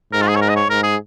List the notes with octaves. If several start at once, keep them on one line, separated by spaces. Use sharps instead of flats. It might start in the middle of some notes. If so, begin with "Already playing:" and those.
G#2 A#4
F4
G#4
C#5
A#4
D#5
C#5
G#2 A#4
G#4